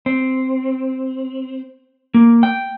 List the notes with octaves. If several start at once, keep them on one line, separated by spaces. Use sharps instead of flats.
C4
A#3
G5